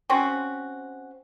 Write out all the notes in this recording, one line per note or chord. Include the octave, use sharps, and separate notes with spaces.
C4 C#4 F#4